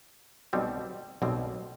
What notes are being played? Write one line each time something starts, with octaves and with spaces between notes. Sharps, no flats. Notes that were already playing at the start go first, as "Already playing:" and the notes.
B1 B2 G3 C4
B1 B2 G3 C4